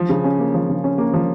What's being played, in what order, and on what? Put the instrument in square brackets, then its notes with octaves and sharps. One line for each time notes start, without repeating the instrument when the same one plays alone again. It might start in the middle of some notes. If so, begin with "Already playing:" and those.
Already playing: [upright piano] F3
C#3
C#4
A#3
F3
C#3
C#4
A#3
F3